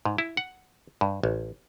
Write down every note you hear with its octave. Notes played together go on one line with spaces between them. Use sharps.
G#2
E4
F#5
G2
A1